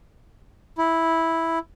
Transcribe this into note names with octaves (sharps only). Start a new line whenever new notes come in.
E4